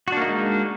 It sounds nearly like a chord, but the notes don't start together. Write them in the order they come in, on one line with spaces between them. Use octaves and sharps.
F#4 D4 A#3 D#4 G#3